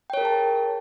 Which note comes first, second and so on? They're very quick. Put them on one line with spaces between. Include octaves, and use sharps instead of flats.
G5 C#5 A#4 G#4 A5